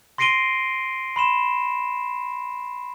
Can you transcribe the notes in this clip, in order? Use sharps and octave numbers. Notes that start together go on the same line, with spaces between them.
C6 A#6 C7 D7 D#7 G7
B5 C6 E7